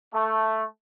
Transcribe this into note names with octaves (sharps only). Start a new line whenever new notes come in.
A3